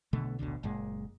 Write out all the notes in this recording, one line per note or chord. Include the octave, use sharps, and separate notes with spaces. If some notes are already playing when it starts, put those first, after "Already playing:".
B1 B2 D3 A3
A1 D2 B2 D3
F#1 F#2 A#2 G#3